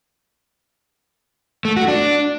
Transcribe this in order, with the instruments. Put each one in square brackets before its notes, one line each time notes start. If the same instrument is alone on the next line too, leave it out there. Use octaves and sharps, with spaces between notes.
[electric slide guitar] A3
F#4
D4